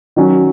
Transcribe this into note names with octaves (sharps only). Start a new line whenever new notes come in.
D#3 F#3 C#4